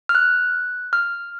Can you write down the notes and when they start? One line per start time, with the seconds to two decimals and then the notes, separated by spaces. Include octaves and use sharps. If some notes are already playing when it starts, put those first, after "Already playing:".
0.09 F6
0.15 F#6
0.93 F6